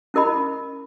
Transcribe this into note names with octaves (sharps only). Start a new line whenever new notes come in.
C#4 E4 A#4 D#5 B5